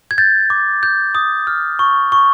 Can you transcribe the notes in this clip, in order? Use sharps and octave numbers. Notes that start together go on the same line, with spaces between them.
G#6
G6 A6
D6
G6
D#6
F6
C#6
C#6